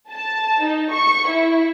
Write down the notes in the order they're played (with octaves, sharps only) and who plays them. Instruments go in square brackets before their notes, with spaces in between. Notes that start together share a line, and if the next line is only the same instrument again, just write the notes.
[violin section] A5
D#4
C#6
E4